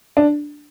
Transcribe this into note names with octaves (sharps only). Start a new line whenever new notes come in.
D4